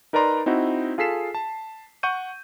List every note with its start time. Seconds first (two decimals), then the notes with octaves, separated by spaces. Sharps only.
0.13 D#4 A#4 B4 D5 A#5 C6
0.46 C4 D#4 E4 F#4
0.98 F4 G#4 A4 B6 C7 E7
1.35 A5
2.03 F#5 C#6 G6 D#7